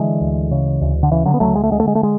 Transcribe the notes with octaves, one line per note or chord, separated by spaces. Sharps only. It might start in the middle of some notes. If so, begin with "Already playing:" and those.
Already playing: D3 E3 G#3
D2
C#3
D2
D3
C#3 E3
D3 F#3
B3
D2 F#3 A3
G#3
A3
D3 G#3
A3
G#3
A3
G#3